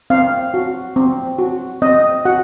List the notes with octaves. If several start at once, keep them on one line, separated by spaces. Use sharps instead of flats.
C4 F5
F#4
C4
F#4
C4 D#5
F#4 F#5